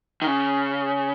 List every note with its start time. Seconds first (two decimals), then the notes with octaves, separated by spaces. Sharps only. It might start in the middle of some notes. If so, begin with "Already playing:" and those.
0.22 D#3
0.27 C#3